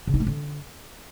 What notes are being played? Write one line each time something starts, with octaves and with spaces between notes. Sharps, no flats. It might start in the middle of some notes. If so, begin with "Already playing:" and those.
C#3
D#4
A3
D3